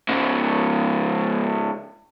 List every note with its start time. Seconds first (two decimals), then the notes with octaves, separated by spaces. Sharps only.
0.09 G#2 C#3